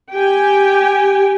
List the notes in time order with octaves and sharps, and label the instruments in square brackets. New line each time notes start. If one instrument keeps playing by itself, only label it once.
[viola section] G4 G5 G#5